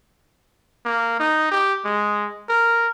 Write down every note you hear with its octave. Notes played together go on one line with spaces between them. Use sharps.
A#3
D#4
G4
G#3
A#4